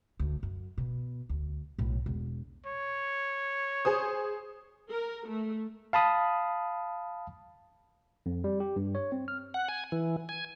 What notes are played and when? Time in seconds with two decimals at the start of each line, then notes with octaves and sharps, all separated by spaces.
0.19 D2
0.43 F#2
0.78 B2
1.29 D2
1.78 B1 A2
2.06 E1
2.66 C#5
3.85 G#4 C5 D#6
4.90 A#4
5.28 A3
5.93 F5 A5 B5 D#6
8.26 F2
8.44 G3
8.60 G4
8.76 G2
8.95 C#5
9.12 C4
9.28 F6
9.54 F#5
9.69 G#5
9.92 E3
10.29 G#5